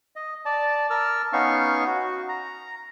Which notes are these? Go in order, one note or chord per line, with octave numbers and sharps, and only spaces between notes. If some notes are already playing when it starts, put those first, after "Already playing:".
D#5
D5 A5
A#4 A5 E6 F6
B3 C#4 D#4 F5 C#6
F#4
A#5